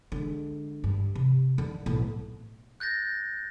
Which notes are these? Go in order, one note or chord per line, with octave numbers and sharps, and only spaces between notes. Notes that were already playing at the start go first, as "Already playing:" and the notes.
D3 G#3
G2
C3
D3 D#3
B1 A2
F#6 G6 A6 A#6